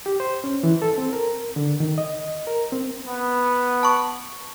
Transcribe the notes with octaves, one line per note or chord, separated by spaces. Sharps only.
G4
C5
C#4
E3
A4
C4
A#4
D3
D#3
D#5
A#4
C4
B3
A5 C#6